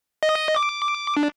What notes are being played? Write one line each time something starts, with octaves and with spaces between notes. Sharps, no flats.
D#5
D6
D4